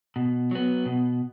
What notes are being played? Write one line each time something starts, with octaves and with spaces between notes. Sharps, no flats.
B2
F#3 B3
B2